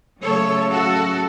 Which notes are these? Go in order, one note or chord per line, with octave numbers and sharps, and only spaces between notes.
C#3 F#3 A3 A4 C#5
F#4 A4